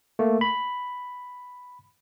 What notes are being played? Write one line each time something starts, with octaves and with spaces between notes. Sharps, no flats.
A3 A#3
B5